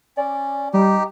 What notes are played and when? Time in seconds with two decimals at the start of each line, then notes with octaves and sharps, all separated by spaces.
0.17 C#4 D5
0.74 G3 D#4 G4